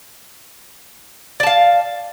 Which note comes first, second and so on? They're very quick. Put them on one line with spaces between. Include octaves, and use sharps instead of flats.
D5 A5 F5